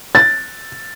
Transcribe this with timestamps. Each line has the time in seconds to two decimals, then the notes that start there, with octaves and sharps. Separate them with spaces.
0.15 A6